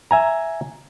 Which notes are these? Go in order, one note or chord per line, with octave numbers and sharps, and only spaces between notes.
E5 G#5 A#5